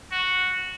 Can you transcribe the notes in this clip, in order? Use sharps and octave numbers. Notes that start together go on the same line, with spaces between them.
F#4